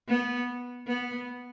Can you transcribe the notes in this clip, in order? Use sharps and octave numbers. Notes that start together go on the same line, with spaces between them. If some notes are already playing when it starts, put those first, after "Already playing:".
B3
B3